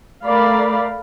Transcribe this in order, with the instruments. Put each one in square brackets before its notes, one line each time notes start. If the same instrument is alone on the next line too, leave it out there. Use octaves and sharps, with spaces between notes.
[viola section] A3 A#4 D5 F5 B5